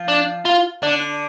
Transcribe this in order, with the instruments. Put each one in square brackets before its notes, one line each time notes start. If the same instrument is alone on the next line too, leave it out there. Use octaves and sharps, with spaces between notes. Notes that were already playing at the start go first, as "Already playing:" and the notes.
Already playing: [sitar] F3
[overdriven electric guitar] D4
F4
[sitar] D3 [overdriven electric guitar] D4